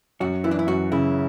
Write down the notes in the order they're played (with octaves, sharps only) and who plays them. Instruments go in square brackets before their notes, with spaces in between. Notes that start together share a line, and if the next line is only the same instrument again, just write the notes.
[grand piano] F#2 [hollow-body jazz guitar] F#4
[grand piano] E3 [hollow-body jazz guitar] E4
[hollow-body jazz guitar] D4
E4
[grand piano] F#2 [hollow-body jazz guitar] F#4
[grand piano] C#3 [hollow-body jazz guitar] E4